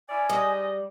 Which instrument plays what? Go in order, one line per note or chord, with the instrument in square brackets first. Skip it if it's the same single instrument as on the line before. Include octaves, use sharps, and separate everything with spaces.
[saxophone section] C#4 E4 D5 [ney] G#5
[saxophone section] G#2 D#5 [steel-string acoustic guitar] G3